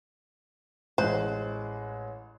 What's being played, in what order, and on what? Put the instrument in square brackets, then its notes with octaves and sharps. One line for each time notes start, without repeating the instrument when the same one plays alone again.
[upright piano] A1 G#3 F#6 [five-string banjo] C5